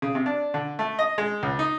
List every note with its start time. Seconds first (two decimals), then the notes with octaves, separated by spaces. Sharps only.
0.02 C#3
0.15 C3
0.26 D4
0.54 D3
0.79 A3
0.99 D#5
1.18 G#3
1.43 C#2
1.59 D#4